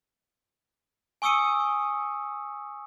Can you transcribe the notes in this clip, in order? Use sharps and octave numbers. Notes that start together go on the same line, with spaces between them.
G#5 C#6 D#6 E6 C#7 D#7